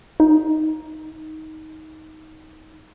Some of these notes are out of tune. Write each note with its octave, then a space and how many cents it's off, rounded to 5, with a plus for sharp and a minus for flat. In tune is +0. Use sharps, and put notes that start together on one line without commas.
D#4 +15